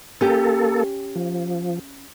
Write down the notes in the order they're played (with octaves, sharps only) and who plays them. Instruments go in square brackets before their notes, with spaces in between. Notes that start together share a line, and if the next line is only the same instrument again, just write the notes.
[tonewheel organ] A#3 A4 [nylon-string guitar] C#4 G4
[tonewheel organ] F3